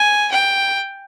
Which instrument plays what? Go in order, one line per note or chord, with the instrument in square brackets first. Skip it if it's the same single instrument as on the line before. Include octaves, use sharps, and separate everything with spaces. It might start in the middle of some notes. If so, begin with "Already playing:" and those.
Already playing: [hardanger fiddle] G#5
G5